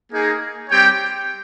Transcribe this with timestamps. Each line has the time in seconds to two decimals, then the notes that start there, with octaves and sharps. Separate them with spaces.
0.12 A#3 D#4 G#4
0.69 G3 C4 G4 C#5 G5